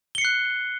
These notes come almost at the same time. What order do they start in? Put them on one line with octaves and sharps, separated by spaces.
G7 C#7 C7 F#6